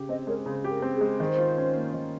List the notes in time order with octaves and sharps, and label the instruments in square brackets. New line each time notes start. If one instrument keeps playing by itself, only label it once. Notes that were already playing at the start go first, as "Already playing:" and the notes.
Already playing: [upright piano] C#3 G4
[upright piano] C4 [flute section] C5 D#5
[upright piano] G#3 [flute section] A#4 C#5
[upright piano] C#3 [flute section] C5
[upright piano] G4
[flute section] A#4
[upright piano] C4
[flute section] G#4
[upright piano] G#3
[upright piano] D#3 [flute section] C5
[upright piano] F4
C#4
A#3
D#3